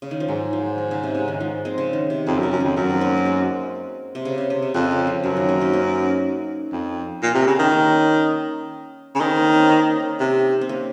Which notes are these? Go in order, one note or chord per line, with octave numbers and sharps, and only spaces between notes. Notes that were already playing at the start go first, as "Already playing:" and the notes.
C#3
D#3
F3
G#2 F#3
F3
D#3
C#3
C3
C#3
D#3
F3
G#3 C4
C#3
D#3
C3
F2 C#3
F#2
C#3
F#2
F2 D#3
F#2 F#3
C4
A#3 C#4
A#3
G#3 C4
C3
C#3
C3
C3
C#3
F2 C#3
C#3
F3
F#2 F#3
D#3
A#3 C#4
C4 D#4
A#3 C#4
F2
A#2
C3
C#3
D#3
A#3 C#4
C#3
D#3 C4 D#4
A#3 C#4
C4 D#4
A#3 C#4
C3
C4
A#3 C#4